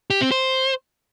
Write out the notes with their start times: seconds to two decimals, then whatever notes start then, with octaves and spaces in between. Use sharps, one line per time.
0.10 G4
0.21 C4
0.31 C5